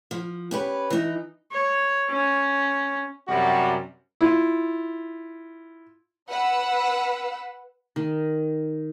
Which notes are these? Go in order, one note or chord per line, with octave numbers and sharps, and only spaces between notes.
F3
C#4 G4 B4
E3 D#4
C#5
C#4
F#2 C3 G3 F#4
E4 F4
B4 F#5 B5 E6
D#3